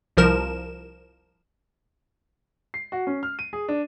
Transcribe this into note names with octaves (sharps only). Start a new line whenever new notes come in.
C2 F3 A#4 E7
C7
F#4
C#4
F6
D#7
G#4
D4